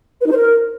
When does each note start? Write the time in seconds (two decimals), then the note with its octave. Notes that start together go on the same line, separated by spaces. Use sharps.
0.21 B4
0.26 D#4
0.31 C5
0.36 A#4